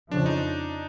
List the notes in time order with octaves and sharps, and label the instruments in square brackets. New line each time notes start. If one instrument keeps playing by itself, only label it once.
[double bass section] F2 C#3 F3 [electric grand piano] D4
[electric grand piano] D#4